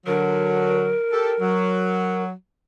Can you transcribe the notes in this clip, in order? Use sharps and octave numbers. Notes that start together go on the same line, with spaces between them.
D3 F#3 A#4
G4 A4
F#3